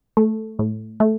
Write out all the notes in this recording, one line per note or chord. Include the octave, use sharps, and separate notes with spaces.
A3
A2
A3